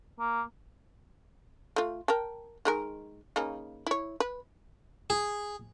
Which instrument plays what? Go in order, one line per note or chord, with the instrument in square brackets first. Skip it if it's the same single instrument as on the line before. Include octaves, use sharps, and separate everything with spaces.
[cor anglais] A#3
[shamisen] A3 F4
A#4 G5 A5
D#3 G#3 A#4
C#3 A#3 D#4
E4 C#5
B4
[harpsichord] G#4